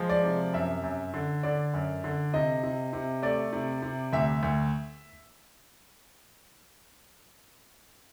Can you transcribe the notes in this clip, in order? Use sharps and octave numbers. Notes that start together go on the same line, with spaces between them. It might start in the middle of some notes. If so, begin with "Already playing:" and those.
Already playing: F3 G#3
D5
C3
F#2 E5
F#2
D3
D3 D5
F#2
D3
C3 D#5
C3
C3
A3 D5
C3
C3
D2 E5
D2